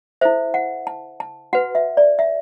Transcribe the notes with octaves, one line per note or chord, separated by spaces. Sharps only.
E4 A4 C5 E5
F#5
A5
A5
F#4 B4 F#5
E5
D5
E5